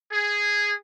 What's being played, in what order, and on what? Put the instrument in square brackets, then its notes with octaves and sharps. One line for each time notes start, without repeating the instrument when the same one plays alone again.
[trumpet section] G#4